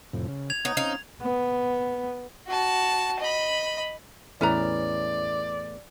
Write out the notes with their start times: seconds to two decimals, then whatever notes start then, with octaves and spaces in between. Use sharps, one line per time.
0.13 F2 A2 C3
0.28 C#3
0.50 G#6 F7
0.65 B3 D#4 C#5 F#5
0.77 C4 C#4 D#4 F5
1.22 B3
2.47 F#4 A5
3.20 D#5 B5
4.41 E2 A2 E3 C#4 B4 D5 A#5